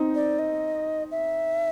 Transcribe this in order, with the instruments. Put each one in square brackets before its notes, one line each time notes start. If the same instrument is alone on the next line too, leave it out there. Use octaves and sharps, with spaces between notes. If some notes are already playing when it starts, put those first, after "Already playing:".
Already playing: [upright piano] C4 D#4
[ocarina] D5
D#5
E5